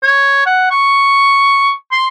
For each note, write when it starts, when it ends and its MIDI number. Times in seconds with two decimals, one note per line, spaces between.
0.03 0.44 73
0.46 0.70 78
0.71 1.72 85
1.92 2.06 84